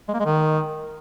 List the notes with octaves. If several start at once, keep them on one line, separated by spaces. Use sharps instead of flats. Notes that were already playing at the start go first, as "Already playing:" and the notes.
G#3
A#3
G#3
D#3